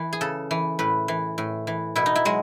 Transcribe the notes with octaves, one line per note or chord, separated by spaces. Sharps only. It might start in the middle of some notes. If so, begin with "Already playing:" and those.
Already playing: E3
G#4
C#3 A4
E3
A2 B4
E3
A2
E3
B2 E4
D#4
E4
F#3 G#3